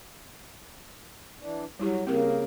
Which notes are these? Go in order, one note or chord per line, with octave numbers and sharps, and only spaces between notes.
E3 D4
F#3 G3 E4 G4
C#3 A#3 C4 G4 A#4